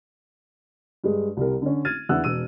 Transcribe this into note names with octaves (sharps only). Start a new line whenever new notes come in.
G2 G#3
C2 G3 A#4
D3 C#4
F6 G#6 A6 D#7
E2 D4 E4 F#5 E6 F#6
E1 E6 D#7